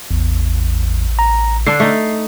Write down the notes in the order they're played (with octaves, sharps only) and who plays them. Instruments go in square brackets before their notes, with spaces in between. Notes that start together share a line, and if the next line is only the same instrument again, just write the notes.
[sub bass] A1 [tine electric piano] E2
[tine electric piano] A#5
[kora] D3 D4 [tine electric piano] C7
[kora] A3 D#4